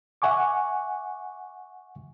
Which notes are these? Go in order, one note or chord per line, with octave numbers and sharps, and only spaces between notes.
E5 F#5 G#5 C#6 D6